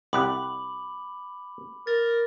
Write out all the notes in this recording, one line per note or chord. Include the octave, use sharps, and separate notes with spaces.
C2 G4 F#5 B5 D6 F#7
A#4 A6